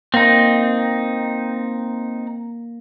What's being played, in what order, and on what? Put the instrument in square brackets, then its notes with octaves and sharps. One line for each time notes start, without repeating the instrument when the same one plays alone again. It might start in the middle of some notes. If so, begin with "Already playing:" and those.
[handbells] A#3 A#6 [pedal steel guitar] C4 D#4